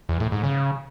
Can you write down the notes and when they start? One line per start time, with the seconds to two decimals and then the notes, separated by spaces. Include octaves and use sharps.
0.09 E2
0.20 A2
0.32 G#2
0.43 C#3